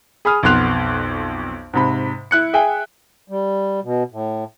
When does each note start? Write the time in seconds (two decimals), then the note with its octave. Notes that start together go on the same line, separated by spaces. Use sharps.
0.25 G#4 B5 D#6 F6
0.43 B1 F2 B3 C6 F#6 F7
1.73 G#2 C3 B5
2.31 E4 F#6 C#7
2.53 G#4 E5 G5 G#5
3.28 G3
3.83 B2
4.12 A2